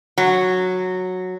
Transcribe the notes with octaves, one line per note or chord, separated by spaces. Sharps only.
F#3